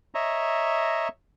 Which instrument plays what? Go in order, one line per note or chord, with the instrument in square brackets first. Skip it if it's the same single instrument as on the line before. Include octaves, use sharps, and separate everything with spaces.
[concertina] C#5 D#5 E5 A#5